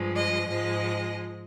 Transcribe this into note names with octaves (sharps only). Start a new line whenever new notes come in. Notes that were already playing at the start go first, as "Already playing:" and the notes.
Already playing: G2 F3 G#3
D#5
G#2 F3 G#3 D#5